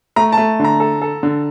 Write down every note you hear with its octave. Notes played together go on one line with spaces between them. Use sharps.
A3 A#5
A5
A3
D3
A#5
A4
A4
D3